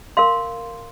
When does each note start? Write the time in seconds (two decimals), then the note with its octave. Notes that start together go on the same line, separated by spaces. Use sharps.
0.17 A#4 F5 C6